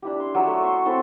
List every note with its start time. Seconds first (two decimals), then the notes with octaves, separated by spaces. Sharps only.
0.02 D4 E4 G4
0.20 C6
0.34 F#3 C#5 D5 E5
0.47 A3
0.63 E5 C6 C#6
0.86 C4 E4 A4